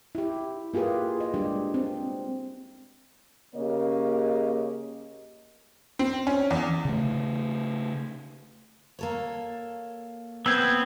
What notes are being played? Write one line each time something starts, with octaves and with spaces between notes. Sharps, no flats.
E4 G4
A#3 F4 G4 G#4 B4
D#5
G3 G#3 D4 G4
C4
C#3 A#3 G4 C#5 D#5
C4
C#4
E2
C#3 A3
A#3 A4 C#5
B3 C4 E6 G#6